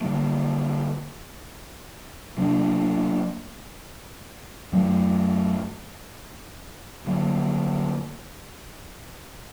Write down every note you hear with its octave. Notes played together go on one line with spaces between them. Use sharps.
D3 G3 A#3
C3 F#3 A#3 D4
F#2 F#3 A3
D3 F#3 A#3